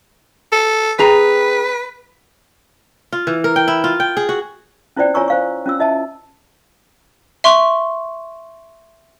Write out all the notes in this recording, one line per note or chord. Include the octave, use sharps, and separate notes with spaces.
A4
C4 G#4 B4 A#5
F4
E3
A#4
G5
E4
F4
G5
G#4
F#4
C#4 E4 F4 C5 D5 G5
F4 C#5 G#5 A#5 C#6 E6
C5 F5 C#6
C#4 F4 E6
E4 D#5 E5 A5
E5 C6 C#6